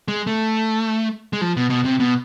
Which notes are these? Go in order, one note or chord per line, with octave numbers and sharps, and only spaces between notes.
G#3
A3
G#3
F3
B2
B2
C3
B2